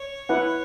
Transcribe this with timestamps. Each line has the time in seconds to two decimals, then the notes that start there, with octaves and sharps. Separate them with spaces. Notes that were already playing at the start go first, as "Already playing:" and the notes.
Already playing: C#5
0.29 E4 B4 F#5